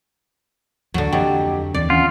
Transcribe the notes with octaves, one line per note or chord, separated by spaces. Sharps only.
D2 D3 F#3
F2 F#3 G4 D#5 G5
D#2 E3 C4 D5
C#4 F4 F#5